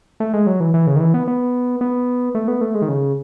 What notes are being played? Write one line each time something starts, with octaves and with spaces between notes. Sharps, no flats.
A3
G#3
F#3
E3
E3
C#3
D#3
E3
B3
B3
B3
A3
B3
A3
G#3
D#3
C#3